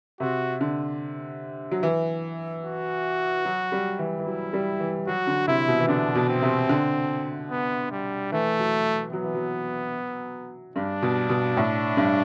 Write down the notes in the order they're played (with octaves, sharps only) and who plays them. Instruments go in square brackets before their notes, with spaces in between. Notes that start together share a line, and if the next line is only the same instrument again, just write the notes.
[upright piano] C3 [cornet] F#4
[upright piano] D3
F#3
E3
[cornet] F#4
[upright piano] F#3
G3
E3
E3
[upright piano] F#3 [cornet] E4
[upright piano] G3
E3
[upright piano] F#3 [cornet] F#4
[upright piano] D3
[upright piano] C3 [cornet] E4
[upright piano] B2
E3
[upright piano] D3 [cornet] D4
[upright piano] B2
[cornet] C4
[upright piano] C3
D3
[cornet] B3
G3
[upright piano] E3 [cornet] A3
[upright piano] F#3
[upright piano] F#3 [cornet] B3
[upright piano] E3
F#3
[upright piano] G2 [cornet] D4
[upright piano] B2
B2
A2
G2